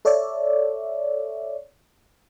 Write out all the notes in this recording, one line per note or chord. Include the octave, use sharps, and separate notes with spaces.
A4 C#5 D5 E5